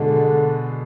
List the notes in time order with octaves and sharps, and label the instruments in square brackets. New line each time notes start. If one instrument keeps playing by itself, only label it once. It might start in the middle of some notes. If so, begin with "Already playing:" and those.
Already playing: [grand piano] B2 G#3 D4 G#4 [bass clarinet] D3